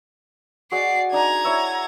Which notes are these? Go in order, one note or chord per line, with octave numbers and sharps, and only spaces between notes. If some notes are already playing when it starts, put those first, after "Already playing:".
F#4 G#4 D5 D#5 C7
D4 D#4 G#5 A#5 G#6
E4 C#5 E5